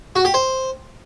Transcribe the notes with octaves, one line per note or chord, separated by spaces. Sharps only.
F#4
G4
C5